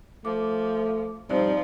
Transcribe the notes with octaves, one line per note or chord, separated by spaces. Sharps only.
F3 A3 D6
F3 G3 C4 D#4 D5